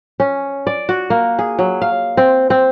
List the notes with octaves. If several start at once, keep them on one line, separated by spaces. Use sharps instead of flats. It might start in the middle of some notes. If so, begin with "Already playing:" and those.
C#4
D5
F#4
A#3
G#4
F#3
F5
C4
C4